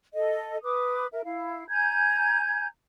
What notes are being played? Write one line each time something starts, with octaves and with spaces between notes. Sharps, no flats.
A4 D#5
B4 D6 D#6
A#4 E5
E4 F5
G#5 A#5 G6 G#6